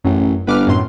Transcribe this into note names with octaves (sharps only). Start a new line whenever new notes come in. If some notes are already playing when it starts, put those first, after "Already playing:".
A1 F#2
G1 B4 D6 F6
F#2 A2 C6